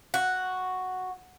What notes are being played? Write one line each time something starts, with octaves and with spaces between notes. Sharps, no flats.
F#4